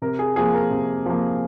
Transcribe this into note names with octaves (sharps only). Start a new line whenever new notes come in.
C3 A#4
G#4
F3 A#3 G#4
A#4
C3
F3 A#3